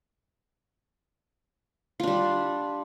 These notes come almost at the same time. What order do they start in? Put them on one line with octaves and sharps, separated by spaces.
F4 D4 G3